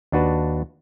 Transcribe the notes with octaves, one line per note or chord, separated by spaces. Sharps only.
D#2 D4 F#4 B4 A5